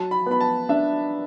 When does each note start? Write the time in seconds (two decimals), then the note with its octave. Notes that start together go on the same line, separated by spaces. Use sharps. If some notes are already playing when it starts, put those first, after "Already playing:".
Already playing: F#3 A5
0.11 B5
0.26 B3 B5
0.40 A5
0.69 D4 E5